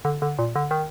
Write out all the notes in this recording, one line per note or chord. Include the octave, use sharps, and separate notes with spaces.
D3
D3
A#2
D3
D#3